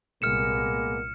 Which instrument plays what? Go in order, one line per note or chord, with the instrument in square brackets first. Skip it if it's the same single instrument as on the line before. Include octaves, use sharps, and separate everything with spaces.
[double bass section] C2 A#2 [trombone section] G#3 A#3 B3 [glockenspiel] F6 C#7 E7